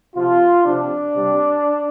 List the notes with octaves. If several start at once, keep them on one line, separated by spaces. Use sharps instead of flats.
C3 F3 F4
C3 F3 D4
C3 G3